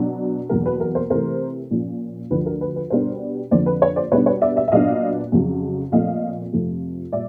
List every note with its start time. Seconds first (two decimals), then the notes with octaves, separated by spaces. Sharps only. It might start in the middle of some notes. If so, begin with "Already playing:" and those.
Already playing: B2 F#3 B3 D4
0.49 E2 B2 F#3 A#3 A#4
0.66 B4
0.80 A#4
0.95 A#4 C5
1.10 C3 E3 A3 A#4 C5
1.71 A#2 F3 A#3 C#4
2.30 D2 D3 F3 B4
2.46 A#4
2.61 B4
2.76 B4
2.90 B2 G3 B3 D4 A#4 C5
3.51 F2 D3 F3 A#3 C5 D5
3.66 B4
3.82 B4 C#5
3.96 C5 D5
4.12 B2 G3 B3 D4 B4 C#5
4.26 B4 C#5
4.42 D5 E5
4.56 D5 E5
4.68 E5
4.72 A#2 F#3 B3 D4 D#5 F5
5.32 F2 C#3 F#3
5.92 A#2 F3 A3 C4 D#5 F5
6.52 F2 C3 F3 A3
7.12 A#2 G3 D5 E5